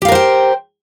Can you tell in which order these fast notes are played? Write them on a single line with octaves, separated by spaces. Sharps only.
G4 F5 A#4 C5 G5